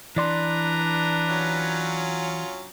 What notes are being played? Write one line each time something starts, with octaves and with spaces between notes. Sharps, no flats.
E3 D4 B4 D5 A#5 C6
F#3 C#4 F4